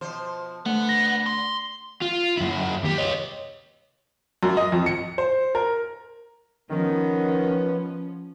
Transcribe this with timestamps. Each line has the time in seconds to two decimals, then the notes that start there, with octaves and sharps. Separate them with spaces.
0.01 B2 F3 C5
0.66 D3 A3 B3 D4 F#5
0.89 A#6
1.26 C6
2.01 F4
2.37 F#2 E4
2.83 D#2 G4
2.98 C#5 D#5
4.43 F#2
4.57 D#5
4.72 F2
4.86 C#7
5.18 C5
5.55 A#4
6.70 D#3 F3 B3 C#4